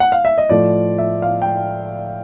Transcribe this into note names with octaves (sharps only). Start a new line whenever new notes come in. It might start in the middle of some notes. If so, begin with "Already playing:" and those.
F#5
F5
E5
D#5
A2 F3 A3 D5
E5
F5
G5